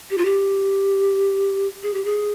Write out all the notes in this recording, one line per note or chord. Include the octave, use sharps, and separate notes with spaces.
G4
F4
G4
G#4
G4
G#4